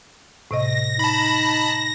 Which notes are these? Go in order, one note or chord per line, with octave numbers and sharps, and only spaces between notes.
A2 C3 D#5 A#6
D#4 A5 B5